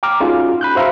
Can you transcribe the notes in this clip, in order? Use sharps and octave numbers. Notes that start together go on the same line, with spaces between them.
G5 A#5 D6 F6
C#4 D#4 F4 F#4 G#4
B5 F#6 G6
F#4 C5 E5 F5 A#5 B5